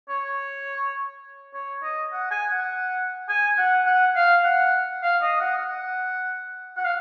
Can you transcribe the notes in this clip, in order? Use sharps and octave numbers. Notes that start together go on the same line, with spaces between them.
C#5
C#5
D#5
F#5
G#5
F#5
G#5
F#5
F#5
F5
F#5
F5
D#5
F#5
F#5
F#5
F5